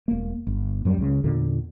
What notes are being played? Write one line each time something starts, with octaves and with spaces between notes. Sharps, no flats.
E1 A#3
G1
F#2 F#3 G3
C#2 C#3
E2 A#2 D3